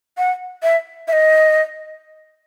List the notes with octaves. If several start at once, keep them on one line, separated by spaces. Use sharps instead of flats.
F#5
E5
E5
D#5